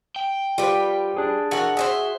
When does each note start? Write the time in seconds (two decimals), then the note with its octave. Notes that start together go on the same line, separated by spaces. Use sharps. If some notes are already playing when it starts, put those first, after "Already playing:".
0.16 G5
0.58 G3 F4 G4 B4 C5
1.17 D4 G#4
1.51 E3 F#4 A#4
1.77 G#4 C5 C#5 E5